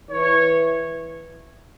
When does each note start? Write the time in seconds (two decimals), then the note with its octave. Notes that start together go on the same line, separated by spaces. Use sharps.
0.11 E3 C#5